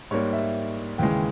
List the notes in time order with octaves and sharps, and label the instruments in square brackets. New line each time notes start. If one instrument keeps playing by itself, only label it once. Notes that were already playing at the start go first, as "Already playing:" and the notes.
[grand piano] G#2 G3 A#3 C#5
E5
D#2 C#3 E3 G#3 G5